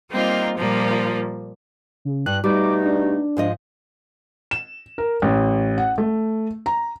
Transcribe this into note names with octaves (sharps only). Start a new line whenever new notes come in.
G3 A#3 C4 D#4 F4
A#2 F3 G3 A#3
C#3
G2 F#6
B2 G3 A3 D#4 D6
D4
G#2 F3 D#5
E7
A#4
A1
F#5
A3
A#5